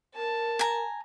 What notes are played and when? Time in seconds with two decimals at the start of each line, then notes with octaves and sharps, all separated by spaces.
0.16 A#4 A5
0.59 G#5 A#5